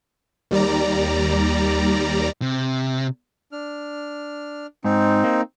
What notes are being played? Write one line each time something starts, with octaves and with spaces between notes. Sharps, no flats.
D#2 G3 D5 A#5
C3
D4 F6
G#2 C4 D#4
A#3